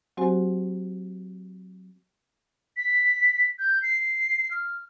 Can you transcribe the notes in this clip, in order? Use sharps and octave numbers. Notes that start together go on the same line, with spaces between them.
F#3 C4 F#4 G4 C5 G#5
B6
G6
C7
F6